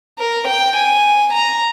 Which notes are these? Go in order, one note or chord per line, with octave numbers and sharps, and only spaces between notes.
A#4
G5
G#5
A#5